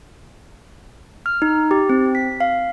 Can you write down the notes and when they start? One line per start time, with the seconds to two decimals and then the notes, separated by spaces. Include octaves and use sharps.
1.26 F6
1.42 D#4
1.71 G4
1.89 C4
2.15 B6
2.40 F5